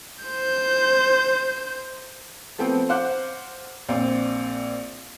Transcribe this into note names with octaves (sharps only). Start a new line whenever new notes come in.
C5 G6
F3 A3 B3 C4
C5 F5 F#5 D6 F#6
A#1 C4 D5